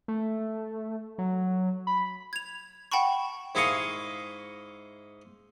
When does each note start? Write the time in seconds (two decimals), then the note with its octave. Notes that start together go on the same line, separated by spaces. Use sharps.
0.08 A3
1.18 F#3
1.87 B5
2.33 G#6 F7
2.92 F#5 G5 A5 B5 C#6
3.55 G#2 E4 G#4 D#5 F5 C#6